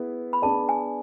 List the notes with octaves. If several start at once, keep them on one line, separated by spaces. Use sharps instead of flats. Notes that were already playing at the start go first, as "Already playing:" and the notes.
Already playing: B3 E4 G#4
B5
B3 D4 G#4 D5 A5
G#5